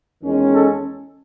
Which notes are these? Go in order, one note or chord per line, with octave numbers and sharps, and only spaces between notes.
E2 D#3 G#3 C#4
A4